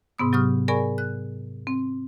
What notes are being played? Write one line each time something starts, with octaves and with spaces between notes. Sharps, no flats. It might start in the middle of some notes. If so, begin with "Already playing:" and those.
G#2 C3 B3 D#6
C3 F#3 G4 C#6 D#6 F6
G#4 A#4 D5 G#5 B5 C#6
F#6
C4